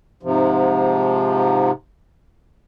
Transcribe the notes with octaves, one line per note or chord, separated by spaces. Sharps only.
G#2 C3 F3